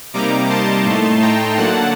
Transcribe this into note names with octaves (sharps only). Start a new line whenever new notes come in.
C3 G3 A#3 D#4 A#5 D6
A5 C6
A2 A3 D#4
G5 A#5
D3 F#3 A#3 F#5 A5